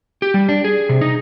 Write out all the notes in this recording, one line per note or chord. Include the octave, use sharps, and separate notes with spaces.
G4
G3
D4
G#4
C3
D#4